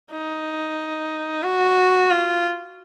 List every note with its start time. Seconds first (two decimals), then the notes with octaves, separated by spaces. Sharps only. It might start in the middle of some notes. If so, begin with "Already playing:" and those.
0.11 D#4
1.43 F#4
2.10 F4